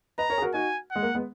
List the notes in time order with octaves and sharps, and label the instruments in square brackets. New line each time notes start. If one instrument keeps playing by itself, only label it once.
[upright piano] B4 D#5 [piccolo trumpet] A#5
[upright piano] A#4 C#5
G#4
F#4 A#4
[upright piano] D#4 F#4 [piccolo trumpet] G#5
[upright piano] G#3 [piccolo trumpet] F#5
[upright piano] A#3
G#3 B3